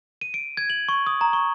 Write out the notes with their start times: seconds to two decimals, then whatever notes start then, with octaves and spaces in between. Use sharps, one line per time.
0.21 D#7
0.34 D7
0.57 G#6
0.70 F#7
0.89 C#6
1.07 D#6
1.21 A#5
1.33 C#6